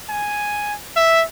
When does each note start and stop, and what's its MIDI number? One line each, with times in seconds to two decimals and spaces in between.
0.10 0.75 80
0.96 1.23 76